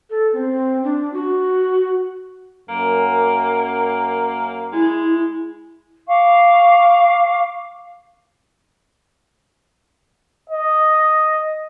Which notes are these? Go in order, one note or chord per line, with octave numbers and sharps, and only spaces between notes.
A4
C4
D4
F#4
F#2 A#3
G#3 E4
F5 C#6 D6
D#5